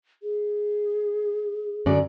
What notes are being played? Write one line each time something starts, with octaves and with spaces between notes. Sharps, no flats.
G#4
F#2 D3 D5